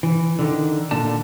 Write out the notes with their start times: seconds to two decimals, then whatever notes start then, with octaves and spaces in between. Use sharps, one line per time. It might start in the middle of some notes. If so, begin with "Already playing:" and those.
0.03 E3
0.39 D3 D#3
0.91 A#2 D3 A5